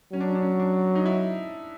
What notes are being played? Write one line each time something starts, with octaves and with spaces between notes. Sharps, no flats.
F#3 C#4
D4
C#4
D4
C#4
D4
D#4
E4